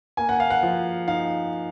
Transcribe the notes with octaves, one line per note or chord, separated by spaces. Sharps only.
A#3 G#5
F#5
F5
F#5
F3
D#4 F5